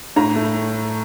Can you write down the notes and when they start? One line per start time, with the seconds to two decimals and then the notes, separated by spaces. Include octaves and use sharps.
0.16 A2 A#5
0.36 A3